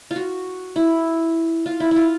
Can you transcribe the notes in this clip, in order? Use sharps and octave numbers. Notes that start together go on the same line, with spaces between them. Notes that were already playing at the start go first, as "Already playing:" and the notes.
F4
F#4
E4
F4
E4
E4 F4